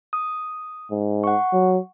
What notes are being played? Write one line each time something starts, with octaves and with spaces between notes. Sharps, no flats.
D#6
G#2
F#5 C#6
F#3